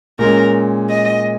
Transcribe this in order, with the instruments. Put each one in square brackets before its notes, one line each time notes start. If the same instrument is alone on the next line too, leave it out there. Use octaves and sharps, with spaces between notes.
[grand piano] A#2 G#3 C#4 [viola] A#4
[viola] D#5